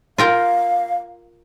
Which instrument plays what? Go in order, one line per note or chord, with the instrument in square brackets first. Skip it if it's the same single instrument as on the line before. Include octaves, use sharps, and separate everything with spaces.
[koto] F4 A#4 G5 [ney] F5